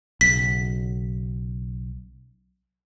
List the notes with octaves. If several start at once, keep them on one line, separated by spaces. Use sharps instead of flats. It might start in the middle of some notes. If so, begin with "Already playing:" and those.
B1 C#3 B6